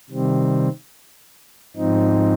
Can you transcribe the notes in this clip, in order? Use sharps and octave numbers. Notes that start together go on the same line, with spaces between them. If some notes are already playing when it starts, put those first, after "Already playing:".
C3 D#3 G3 C4
G#2 F3 C4 D#4